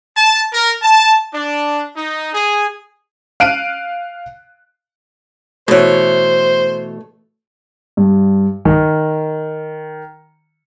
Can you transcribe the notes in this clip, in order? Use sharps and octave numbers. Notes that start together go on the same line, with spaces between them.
A5
A#4
A5
D4
D#4
G#4
F5 F#6 D7 D#7
B2 E3 A3 C5 C#5
G2
D#3